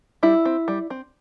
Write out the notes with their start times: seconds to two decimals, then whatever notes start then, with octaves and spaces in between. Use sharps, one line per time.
0.23 G3 E4
0.45 C4
0.68 G3
0.90 C4